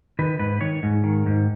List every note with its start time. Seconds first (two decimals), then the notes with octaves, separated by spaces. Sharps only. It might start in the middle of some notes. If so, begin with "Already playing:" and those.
0.19 D#3 B4
0.39 G#2 B4
0.61 D#3 C#5
0.83 G#2
1.04 D#3
1.26 G#2